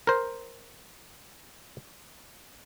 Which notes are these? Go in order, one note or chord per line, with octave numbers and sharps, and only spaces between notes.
A#4 C5